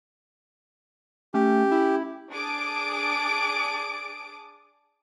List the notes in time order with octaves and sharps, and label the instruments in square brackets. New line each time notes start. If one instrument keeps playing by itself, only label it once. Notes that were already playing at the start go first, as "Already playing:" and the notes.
[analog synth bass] A3 [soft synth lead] C#4 [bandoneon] G4
[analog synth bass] E4
[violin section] D4 G#4 A5 D6 D#6 D7